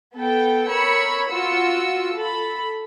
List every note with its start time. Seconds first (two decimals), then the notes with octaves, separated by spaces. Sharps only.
0.15 B3 A4 G5
0.67 A#4 C#5 B5 E6 C#7
1.31 F4 F#4 E6 C#7
2.15 A4 B5